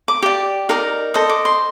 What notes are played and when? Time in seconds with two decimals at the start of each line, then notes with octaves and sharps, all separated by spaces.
0.08 D6
0.22 G4 D5
0.69 D#4 A#4 D5
1.14 A4 C5 D#5 D#6
1.29 D6
1.45 C6